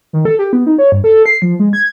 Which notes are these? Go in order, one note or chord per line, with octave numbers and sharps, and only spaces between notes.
D#3
A4
G4
B3
D#4
C#5
G2
A4
C7
F3
G#3
G#6